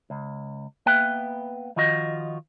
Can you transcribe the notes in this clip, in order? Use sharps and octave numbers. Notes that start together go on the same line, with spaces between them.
C#2
A#3 B3 B4 E5 G5
D#3 F3 F4 F#4 D#5